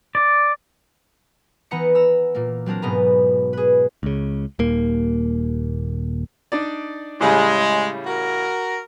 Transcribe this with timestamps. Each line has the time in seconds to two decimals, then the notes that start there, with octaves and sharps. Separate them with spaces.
0.15 D5
1.71 E3 B3 D#4 F#5 A#5 C#7
1.95 A#5 E6
2.35 A#2 A#3
2.66 F#3 C4 D4 A#4
2.82 E1 G#2 B2 B3 D#4 A#5
3.53 G#4 B4
4.03 C#2 C#3
4.59 D#1 D#2 A#3
6.52 D4 D#4 D5
7.21 A2 C#3 G3 G#3
8.06 F#4 A#4